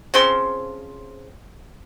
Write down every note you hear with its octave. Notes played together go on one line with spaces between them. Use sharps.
C#3 F3 C4 C6